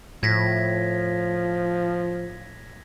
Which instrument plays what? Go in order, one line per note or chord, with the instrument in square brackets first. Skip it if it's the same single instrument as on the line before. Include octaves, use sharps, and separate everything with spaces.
[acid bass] A2 [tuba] F3 [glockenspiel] G#6 A#6 B6